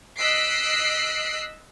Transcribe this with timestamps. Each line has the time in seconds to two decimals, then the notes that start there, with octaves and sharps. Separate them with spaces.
0.19 D#5 E6 F#6 B6 C7 D7